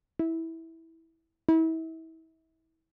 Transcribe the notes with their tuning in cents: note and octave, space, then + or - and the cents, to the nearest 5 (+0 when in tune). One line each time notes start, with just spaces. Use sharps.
E4 -15
E4 -35